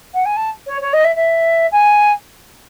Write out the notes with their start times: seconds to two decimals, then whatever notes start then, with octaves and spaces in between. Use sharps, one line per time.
0.14 F#5
0.25 G#5
0.37 A5
0.67 C#5
0.81 C#5
0.93 D#5
1.05 E5
1.16 E5
1.72 G#5